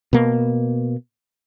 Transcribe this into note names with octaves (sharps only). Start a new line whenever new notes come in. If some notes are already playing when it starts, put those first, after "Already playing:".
B2 A#3